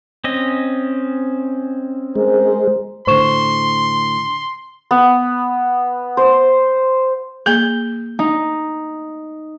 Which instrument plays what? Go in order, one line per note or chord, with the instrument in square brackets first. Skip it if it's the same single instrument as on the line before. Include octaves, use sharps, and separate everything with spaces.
[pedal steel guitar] C4 C#4 D#5
[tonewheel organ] G#3 [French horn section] G#4 A#4 C5
[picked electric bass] A2 D3 [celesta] C5 C#6 E7 [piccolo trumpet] C6
[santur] B3
C5
[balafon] A#3 G#4 [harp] G6
[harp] D#4